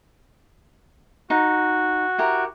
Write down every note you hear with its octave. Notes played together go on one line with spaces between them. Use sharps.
D#4 F#4
E4 G4 A#4